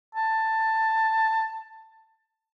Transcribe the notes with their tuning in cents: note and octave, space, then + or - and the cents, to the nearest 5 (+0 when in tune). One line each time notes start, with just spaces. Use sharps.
A5 +15